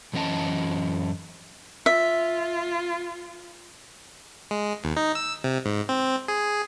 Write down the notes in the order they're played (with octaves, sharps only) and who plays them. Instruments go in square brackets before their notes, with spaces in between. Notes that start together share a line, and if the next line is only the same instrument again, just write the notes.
[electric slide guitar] F#2 E3 C#4 D#5 A5
[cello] F4 [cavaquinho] E5
[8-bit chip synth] G#3
D#2
D#4
E6
C3
G#2
C4
G#4